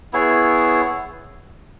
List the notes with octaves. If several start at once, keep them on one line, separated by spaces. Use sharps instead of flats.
B3 E4 G#4 C#5